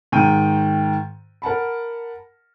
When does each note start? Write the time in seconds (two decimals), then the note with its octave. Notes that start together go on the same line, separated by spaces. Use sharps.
0.12 G#2 D#3 G5 D#7
1.42 A#4 F#5 A5 B5